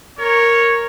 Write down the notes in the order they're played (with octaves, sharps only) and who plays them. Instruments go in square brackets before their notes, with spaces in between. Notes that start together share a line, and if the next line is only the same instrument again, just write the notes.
[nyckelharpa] A#4 [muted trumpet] C#5